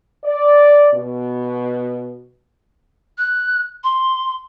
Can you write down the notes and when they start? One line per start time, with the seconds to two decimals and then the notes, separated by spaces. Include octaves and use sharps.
0.24 D5
0.95 B2
3.18 F#6
3.84 C6